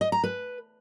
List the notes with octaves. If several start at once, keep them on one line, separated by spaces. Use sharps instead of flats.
D#5
A#5
B4